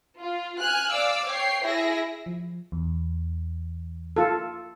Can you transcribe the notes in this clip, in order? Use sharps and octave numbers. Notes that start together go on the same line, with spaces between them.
F4
G#5 F6 F#6
D5 F5 D6 E6
C#5 G5 C7
E4 G#4 E5 A#6
F3
E2
F4 A4